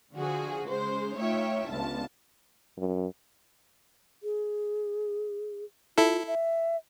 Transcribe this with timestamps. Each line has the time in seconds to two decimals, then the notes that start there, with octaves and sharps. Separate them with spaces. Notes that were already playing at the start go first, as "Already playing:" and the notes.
0.15 D3 F3 F#4 G#4
0.67 C#3 G#3 C5
1.17 A3 D#4 F4 C#5 E5 G5
1.69 G1 C#2 B3 F4 A5
2.77 F#2
4.23 G#4
5.98 E4 F4 A4
6.27 E5